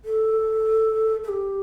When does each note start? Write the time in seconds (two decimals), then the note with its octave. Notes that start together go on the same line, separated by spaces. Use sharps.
0.05 A4
1.23 A4
1.29 G4